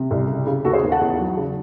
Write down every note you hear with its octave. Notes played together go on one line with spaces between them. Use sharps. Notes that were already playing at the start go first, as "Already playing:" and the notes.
Already playing: C3
C2
C#3
C#3
D#2 F#4 A4
G#4 C5
D#2
F#5 A5
E2
F#3
C#3